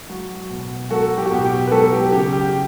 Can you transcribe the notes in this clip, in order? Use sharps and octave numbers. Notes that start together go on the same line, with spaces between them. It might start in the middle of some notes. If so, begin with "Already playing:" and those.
F#3 F#4
B2
F#3 F#4 A4
G4
F#4
B2 G4
G4
B4
F#3 F#4 A4
G4
C#3 G4
G4